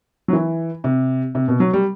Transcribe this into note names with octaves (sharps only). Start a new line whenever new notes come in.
F#3
E3
C3
C3
B2
F#3
G3